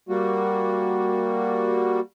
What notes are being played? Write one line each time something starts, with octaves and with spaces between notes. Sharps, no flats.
G3 A#3 F#4